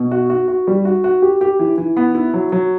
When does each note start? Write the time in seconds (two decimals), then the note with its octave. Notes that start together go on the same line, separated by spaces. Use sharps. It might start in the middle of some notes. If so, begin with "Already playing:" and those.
Already playing: B2
0.11 F#4
0.30 F#4
0.48 F#4
0.67 G3
0.85 F#4
1.04 F#4
1.22 G4
1.41 G4
1.59 E3
1.78 E3
1.97 B3
2.15 E4
2.34 F#3
2.52 F#3